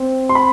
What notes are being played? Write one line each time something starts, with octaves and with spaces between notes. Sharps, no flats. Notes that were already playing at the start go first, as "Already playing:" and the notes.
Already playing: C4
C6
B5